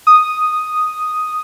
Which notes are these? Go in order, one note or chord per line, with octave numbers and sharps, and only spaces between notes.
D#6